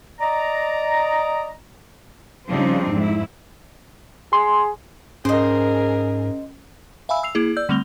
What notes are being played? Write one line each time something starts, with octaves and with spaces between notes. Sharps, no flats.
D5 D#5 A#5
C#3 F3 G3 C4 D4 D#4
F2 G#2 E4
G#4 C6
G#2 C#4 G#4 A#4 C5 D#5
E5 F5 G#5 B5 E6
E6 C7 F7
A#3 E4 G#4
D5 E6 G6
D3 G3 A3 C4 F7 G7